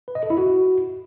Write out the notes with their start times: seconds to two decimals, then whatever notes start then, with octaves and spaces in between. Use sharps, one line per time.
0.08 B4
0.15 D#5
0.23 A4
0.30 E4
0.38 F#4